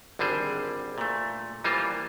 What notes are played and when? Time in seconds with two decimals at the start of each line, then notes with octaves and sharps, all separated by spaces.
0.19 G#1 D3 G3 G#4 C5
0.98 A#2 A3
1.64 E3 G3 A#3 F4 C5